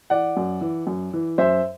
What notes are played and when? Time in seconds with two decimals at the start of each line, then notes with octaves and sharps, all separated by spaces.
0.10 E3 D5 F#5
0.37 F#2
0.61 E3
0.87 F#2
1.13 E3
1.38 F#2 C5 E5